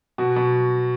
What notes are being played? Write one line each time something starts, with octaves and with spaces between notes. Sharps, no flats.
B2 F#4
B2